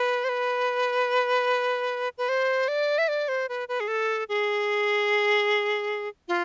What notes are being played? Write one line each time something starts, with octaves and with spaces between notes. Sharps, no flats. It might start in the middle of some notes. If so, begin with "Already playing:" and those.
Already playing: B4
C5
B4
B4
C5
D5
E5
D5
C5
B4
B4
G#4
A4
G#4
F4